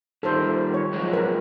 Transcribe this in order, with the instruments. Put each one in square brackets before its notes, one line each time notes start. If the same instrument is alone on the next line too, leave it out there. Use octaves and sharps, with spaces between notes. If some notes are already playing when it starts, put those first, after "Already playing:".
[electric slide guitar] D#3 G3 [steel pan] A4 C5
[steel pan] C#5
[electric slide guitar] F3 F#3 G#3
[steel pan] A#4 B4